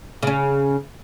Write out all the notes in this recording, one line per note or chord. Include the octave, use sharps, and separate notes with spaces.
C#3 C#4